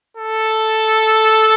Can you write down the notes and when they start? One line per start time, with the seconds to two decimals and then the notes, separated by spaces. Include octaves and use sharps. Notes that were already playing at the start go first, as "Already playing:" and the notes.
0.17 A4